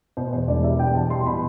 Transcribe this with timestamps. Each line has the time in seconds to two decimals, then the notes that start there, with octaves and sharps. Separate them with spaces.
0.17 B2 C5
0.32 E2 C5
0.48 E1 D5
0.64 G3 E5
0.79 B2 G5
0.95 E2 A5
1.10 G3 C6
1.26 B2 B5